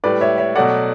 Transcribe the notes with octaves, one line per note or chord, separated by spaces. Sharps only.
A2 G3 B4 D5
C#5 E5
C#5 E5
B2 F#3 A3 D5 F#5